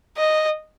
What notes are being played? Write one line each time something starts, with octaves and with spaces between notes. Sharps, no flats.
D#5